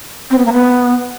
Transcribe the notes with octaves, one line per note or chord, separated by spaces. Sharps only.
C4
B3
A#3
B3